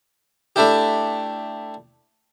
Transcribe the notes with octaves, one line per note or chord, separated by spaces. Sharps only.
A3 D4 E4 G4